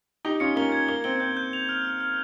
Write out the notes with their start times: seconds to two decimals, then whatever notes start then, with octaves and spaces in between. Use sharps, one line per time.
0.25 D#4 G4 G7
0.40 C#4 F4 C#7
0.56 A#3 C#4 G7
0.72 G#6
0.89 A#3 G7
1.04 C4 G7
1.20 C4 G6
1.37 G6
1.53 F7
1.69 F6
1.85 F6
2.00 F6